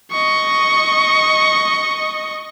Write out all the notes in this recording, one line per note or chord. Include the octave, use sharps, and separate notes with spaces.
D#5 C#6